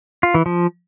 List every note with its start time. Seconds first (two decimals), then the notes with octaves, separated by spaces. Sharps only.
0.23 F4
0.34 E3
0.46 F3